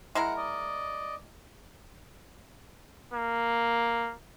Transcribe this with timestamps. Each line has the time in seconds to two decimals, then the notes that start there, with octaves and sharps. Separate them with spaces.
0.15 G#3 E4 A#4 F#5
0.37 D5 D#5
3.14 A#3